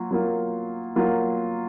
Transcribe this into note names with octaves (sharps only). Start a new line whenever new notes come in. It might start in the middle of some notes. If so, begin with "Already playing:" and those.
Already playing: F#3 A#3 F4
F#3 A#3 F4
F#3 A#3 F4